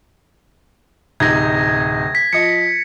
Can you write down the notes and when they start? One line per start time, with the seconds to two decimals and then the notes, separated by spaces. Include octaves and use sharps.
1.20 D1 C3 D#4 G#6 A#6
2.15 B6
2.33 F3 D#5 C#7